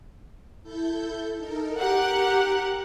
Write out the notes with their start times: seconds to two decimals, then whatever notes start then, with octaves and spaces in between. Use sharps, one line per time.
0.63 E4 A4 G6
1.38 D#4 A4 A#4
1.78 G4 A#4 F#5 F#6